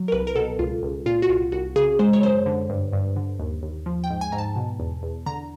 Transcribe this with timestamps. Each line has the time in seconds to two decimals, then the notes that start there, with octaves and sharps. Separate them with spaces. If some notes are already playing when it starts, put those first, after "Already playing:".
Already playing: F#3
0.08 A#4
0.12 C2 B4
0.27 A#4
0.36 B2 A4
0.59 C#2 F4
0.83 C#2
1.06 A#2 F4
1.22 F#4
1.29 C2 F4
1.52 C2 F#4
1.76 C#3 G#4
1.99 G#3 C5
2.13 C#5
2.23 F#2 C5
2.46 D3
2.70 G2
2.93 G2
3.16 D3
3.39 D#2
3.63 D#2
3.86 F3
4.04 G5
4.10 G#2
4.21 G#5
4.32 G#2 A#5
4.38 A5
4.56 B2
4.80 E2
5.03 E2
5.26 D3 A#5